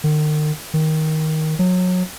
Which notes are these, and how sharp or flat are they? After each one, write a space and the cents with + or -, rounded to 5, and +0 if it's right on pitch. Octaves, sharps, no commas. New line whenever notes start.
D#3 -40
D#3 +10
F#3 -25